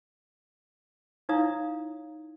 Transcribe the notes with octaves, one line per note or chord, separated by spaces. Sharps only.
D#4 E4 C#5 F5 A#5 D#6